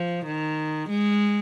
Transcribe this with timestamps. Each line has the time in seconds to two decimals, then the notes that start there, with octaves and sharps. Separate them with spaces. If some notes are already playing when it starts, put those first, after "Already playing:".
Already playing: F3
0.26 D#3
0.90 G#3